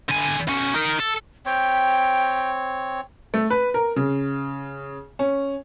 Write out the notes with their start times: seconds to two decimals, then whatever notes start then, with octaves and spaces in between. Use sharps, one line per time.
0.09 D3 G#5
0.48 B1 C#4
0.74 D#4 A#4
0.99 A4
1.46 C4 C#5 G5
3.34 A3
3.50 B4
3.74 A#4
3.96 C#3
5.19 C#4